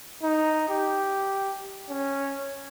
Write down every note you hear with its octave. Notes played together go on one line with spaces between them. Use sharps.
D#4
G4
C#4